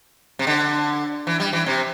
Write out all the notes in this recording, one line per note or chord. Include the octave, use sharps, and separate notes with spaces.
C3
D3
E3
G3
E3
C3